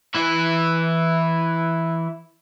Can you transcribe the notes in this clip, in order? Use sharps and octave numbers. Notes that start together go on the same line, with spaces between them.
E3 E4